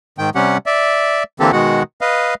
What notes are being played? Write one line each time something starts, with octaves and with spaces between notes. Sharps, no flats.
G#2 D#3 G5
C3 G3 C#4 G4 F#5
D5 E5
D3 E3 A#3 C4 G4 A4
B2 D#3 G#3 F#4 F#5
B4 D#5 F5